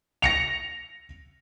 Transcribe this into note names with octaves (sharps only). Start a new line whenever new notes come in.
A#6 C#7 F7